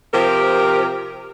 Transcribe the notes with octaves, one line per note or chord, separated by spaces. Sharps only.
C3 F3 G4 A#4